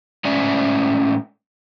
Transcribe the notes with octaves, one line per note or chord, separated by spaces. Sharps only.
A2 G#3 C#4 D5 E5 G#5